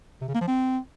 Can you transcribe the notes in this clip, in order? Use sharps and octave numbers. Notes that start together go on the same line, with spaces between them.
C3
C#3
A#3
F3
C4